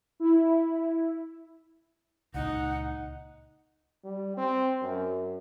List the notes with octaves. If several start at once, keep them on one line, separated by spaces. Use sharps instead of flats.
E4
C#2 A#2 D#4 F#5
G3
C4
F#2